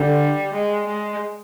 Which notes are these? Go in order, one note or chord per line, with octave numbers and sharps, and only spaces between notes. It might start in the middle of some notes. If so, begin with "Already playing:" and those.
Already playing: D3 G3
G#3
G#3